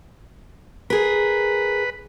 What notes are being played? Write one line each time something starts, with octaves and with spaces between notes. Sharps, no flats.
G#4 A#4 B4